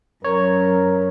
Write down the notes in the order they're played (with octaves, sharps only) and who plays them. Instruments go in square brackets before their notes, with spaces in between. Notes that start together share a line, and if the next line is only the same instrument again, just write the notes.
[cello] F#2 [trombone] A#4 [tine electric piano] C#5